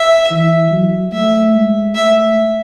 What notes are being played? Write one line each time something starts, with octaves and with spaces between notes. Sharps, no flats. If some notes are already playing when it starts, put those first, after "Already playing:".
Already playing: E5
E3
F#3
A3 E5
G#3
A3 E5